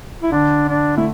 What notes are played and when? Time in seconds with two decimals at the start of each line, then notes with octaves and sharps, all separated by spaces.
0.23 E4
0.32 D3 D4
0.69 D4
0.97 A3 E4